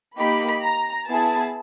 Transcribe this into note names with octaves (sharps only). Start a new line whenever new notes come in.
A#3 D#4 G4 B5
A#5
B3 E4 G#4 A5